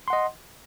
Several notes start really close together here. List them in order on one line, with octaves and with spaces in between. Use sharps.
C6 F#5 D#5